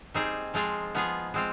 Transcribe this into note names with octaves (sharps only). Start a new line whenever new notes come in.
G3 C4 D#4 G#4
F3 G#3 C4 F4 G#4
F3 B3 F4 G#4
G#3 C4 F4